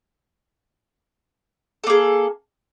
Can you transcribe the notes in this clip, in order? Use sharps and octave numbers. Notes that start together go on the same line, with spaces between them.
A#3 G#4 A4